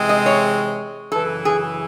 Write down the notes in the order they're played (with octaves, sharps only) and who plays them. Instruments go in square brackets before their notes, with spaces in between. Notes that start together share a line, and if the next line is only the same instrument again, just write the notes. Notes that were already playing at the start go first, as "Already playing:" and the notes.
Already playing: [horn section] C3 E3 G#3 C4
[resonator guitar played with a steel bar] D#5
C#5
[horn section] F#2 C#3 E3 [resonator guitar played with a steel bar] A4
[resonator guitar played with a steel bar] G#4